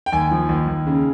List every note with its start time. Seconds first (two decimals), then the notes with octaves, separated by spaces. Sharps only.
0.06 G5
0.12 D#2 G#5
0.31 F3
0.49 D#2
0.68 D#2
0.87 C#3